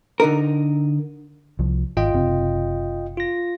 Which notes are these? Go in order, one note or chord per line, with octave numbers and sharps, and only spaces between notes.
D3 D#4 A#4
C2 F3
G#1 F4 D#5 G5
F#1 C3 C4
F4 A#6